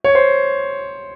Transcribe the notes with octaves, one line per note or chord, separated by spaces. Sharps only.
C#5
C5